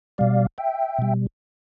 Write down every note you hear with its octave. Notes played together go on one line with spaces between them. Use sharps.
B2 G3 D5 F5
E5 G5
B2 G3